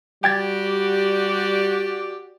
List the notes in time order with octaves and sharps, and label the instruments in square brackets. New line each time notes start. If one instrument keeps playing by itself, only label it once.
[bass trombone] G3 [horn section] F#4 G4 D5 [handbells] G5 G#6 A6